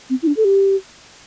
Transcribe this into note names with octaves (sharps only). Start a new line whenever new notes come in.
C4
E4
D4
A4
G4